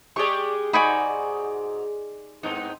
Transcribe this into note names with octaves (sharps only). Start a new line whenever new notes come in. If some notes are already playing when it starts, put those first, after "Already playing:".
G#3 G4 G#4 D5 C#6
G#2 D#4 F#4 D5 G#5 B5
G#2 B3 C4 D#4